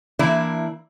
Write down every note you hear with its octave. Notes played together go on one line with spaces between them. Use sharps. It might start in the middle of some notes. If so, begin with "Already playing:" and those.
E3 A#3 D4 E4 D5